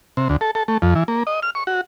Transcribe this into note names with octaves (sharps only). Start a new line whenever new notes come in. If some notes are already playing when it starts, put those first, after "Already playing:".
C3
D2
A4
A4
A3
F2
E3
A#3
D#5
F6
C#6
F#4